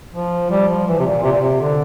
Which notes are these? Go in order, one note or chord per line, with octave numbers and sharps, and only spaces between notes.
F3
G3
F3
E3
C3
A#2
C3
A#2
C3
D3